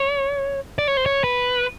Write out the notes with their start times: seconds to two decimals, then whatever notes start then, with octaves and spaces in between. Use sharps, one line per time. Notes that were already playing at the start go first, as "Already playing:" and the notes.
Already playing: C#5
0.78 D5
0.88 C#5
0.97 C5
1.06 C#5
1.24 B4